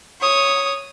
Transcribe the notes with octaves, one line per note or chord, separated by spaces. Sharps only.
C#5 D#6